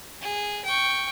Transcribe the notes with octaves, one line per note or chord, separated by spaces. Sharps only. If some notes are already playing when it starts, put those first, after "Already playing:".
G#4
G5 C#6